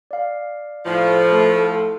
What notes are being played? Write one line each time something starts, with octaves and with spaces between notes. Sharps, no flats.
D5 F5
A2 F3
A3 A4